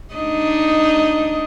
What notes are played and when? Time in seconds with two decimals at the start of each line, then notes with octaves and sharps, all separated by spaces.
0.14 D4 D#4 D#5